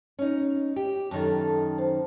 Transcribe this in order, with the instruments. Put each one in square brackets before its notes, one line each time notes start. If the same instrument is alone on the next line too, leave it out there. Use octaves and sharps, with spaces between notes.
[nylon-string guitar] C#4 D#4
G4
[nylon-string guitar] F#2 D#3 [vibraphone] A4 A5
[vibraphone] C5 A5